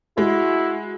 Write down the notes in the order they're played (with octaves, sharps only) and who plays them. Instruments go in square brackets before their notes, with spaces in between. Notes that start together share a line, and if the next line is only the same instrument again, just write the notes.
[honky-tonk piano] G#3 [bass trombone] E4 [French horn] F#4